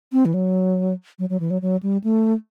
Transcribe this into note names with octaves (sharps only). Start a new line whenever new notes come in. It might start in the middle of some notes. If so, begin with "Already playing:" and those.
C4
E3
F#3
F#3
F#3
E3
F#3
F#3
G3
A3